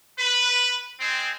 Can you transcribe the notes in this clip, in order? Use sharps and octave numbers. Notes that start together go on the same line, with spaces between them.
B4
G#3 C4